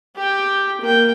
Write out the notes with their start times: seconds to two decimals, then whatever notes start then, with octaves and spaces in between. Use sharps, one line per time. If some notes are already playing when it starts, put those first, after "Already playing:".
0.16 G4 G5
0.81 A#3 G5